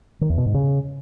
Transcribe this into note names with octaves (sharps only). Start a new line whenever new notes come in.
D#3
E2
B2
G#2
C#3